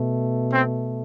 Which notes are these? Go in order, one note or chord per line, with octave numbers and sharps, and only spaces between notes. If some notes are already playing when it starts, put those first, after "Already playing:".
Already playing: B2 A3
C4